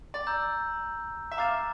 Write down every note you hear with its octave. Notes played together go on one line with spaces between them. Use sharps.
D5
A#5 E6 G6
E5
F5 A#5 D6 A6 E7